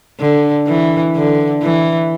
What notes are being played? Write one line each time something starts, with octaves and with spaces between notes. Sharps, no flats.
D3
E3
D3
E3